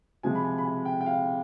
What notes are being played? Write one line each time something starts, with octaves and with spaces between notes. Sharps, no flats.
C3 F3 G#3 G#5
B5
G#5
B5
G#5
G5
G5
F5